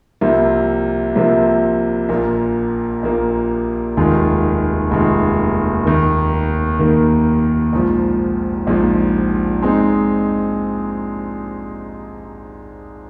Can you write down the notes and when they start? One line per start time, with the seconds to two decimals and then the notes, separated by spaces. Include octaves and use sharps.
0.21 C2 C3 F3 A#3
1.15 C2 C3 F3 A#3
2.09 A#1 A#2 A#3
3.03 A#1 A#2 A#3
3.97 F1 D#2 D#3 G#3 F4
4.91 F1 D#2 D#3 G#3 F4
5.85 D#2 D#3 A#3
6.79 D#2 D#3 A#3
7.73 A#1 G#2 F3
8.67 A#1 G#2 F3
9.61 G#2 G#3 C4 D#4